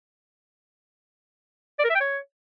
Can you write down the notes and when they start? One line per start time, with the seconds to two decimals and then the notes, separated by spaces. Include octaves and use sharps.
1.79 D5
1.85 A#4
1.90 E5
1.95 G5
2.01 C#5